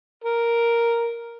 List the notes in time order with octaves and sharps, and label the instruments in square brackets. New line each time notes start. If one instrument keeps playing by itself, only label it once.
[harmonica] A#4